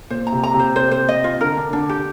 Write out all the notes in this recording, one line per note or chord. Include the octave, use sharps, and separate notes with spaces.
A#2 C5
A#5
C3
A#5
C3
C5
C5
C5
D#5
F4
D3 A#4
D4
D3 D4
G4